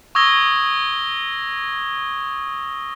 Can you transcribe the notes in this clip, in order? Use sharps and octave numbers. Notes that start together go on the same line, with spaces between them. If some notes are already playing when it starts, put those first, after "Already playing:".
C#6 D#6 E6 G#6 A#6 G7